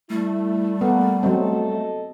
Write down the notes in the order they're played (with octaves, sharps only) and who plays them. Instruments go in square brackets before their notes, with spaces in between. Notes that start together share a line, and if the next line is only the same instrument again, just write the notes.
[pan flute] G3 [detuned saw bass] A3 [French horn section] E4
[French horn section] A#3 A4 [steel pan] B3
[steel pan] F#3 C4 [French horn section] A4 D#5